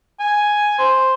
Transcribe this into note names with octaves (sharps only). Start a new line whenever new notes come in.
G#5
C5